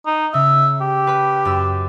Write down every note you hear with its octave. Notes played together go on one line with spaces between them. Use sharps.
D#4
C#3 E5
G4
B4 B5
F#2 E6